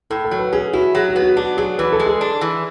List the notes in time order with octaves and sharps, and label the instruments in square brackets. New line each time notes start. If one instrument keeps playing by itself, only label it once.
[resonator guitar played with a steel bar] A2 [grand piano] A4
[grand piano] A4
[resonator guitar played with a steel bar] F#3
[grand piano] B4
[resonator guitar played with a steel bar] C#4 [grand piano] G#4
[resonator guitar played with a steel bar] E4 [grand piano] F#4
[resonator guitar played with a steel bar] F#3 [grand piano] G#4
[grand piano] F#4
[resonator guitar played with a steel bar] B3
[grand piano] F#4
[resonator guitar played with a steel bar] D4 [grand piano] F#4
[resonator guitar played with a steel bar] F#3 [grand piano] G#4
[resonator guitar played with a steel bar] E3 [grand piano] B4
[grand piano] A4
[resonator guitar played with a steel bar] G#3
[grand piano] G#4
[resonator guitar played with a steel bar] D4
E3